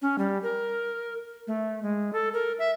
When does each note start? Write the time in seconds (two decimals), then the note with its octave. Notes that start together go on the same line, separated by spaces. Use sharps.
0.02 C#4
0.18 G3
0.43 A#4
1.47 A3
1.83 G#3
2.13 A4
2.33 A#4
2.59 E5